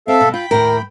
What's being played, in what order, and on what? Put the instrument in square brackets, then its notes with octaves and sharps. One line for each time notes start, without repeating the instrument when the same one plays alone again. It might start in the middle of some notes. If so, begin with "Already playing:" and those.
[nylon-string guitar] C4 [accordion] A4 E5 F5
[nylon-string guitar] B2
[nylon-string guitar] F4 [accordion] G5 B5
[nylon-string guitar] D#2 A2 [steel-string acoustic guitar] A#4